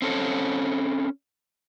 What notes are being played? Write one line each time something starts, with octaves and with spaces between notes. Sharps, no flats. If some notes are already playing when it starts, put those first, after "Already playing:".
C4 C#4 A4